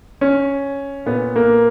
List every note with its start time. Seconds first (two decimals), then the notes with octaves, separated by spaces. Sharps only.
0.21 C#4
1.06 A#2 B3
1.36 A#3